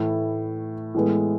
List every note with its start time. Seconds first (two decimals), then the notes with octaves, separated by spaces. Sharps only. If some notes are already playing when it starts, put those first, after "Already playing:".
Already playing: A2 E3 A3 E4
0.95 A2 E3 G#3 B3